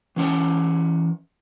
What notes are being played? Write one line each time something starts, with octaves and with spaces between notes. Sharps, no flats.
E3 C#4 F#5 G5